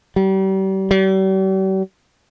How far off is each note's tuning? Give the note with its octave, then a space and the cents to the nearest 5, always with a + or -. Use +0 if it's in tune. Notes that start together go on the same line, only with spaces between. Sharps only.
G3 -35
G3 -45